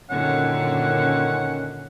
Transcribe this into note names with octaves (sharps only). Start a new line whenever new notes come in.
F#2 A#2 D3 D#3 C#4 F#5